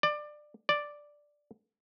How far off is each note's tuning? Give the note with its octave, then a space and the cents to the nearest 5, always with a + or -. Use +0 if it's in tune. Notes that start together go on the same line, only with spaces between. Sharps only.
D5 +20
D5 +0